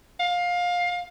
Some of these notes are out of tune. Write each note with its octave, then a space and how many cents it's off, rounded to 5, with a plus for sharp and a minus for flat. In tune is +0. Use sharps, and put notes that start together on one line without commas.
F5 +20